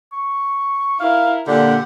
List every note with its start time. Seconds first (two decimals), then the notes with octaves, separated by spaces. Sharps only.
0.12 C#6
1.00 E4 A#4 F5
1.47 A#2 D3 G4 F#5